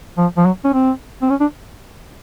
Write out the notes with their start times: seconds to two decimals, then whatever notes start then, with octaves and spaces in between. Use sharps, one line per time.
0.18 F3
0.37 F3
0.46 F#3
0.64 C#4
0.74 C4
1.22 C4
1.30 C#4
1.40 D4